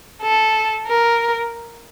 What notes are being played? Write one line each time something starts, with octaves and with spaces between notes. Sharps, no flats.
A4
A#4